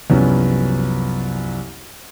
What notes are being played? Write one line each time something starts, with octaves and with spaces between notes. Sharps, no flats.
C2 F#2 F3 B3 C#4